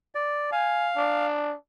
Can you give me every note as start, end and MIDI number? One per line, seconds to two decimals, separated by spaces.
0.15 0.50 74
0.52 1.26 77
0.52 0.90 80
0.96 1.54 62